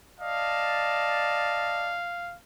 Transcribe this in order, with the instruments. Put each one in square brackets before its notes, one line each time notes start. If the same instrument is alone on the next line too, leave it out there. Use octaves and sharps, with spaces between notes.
[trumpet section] D5 D#5 A5 [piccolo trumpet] F5